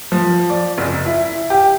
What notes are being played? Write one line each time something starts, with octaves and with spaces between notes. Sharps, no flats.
F3
D5
F#1
E4
G4